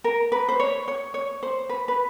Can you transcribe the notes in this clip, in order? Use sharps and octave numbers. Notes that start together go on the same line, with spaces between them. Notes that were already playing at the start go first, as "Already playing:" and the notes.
A#4
B4
C5
C#5
C#5
C#5
C5
B4
B4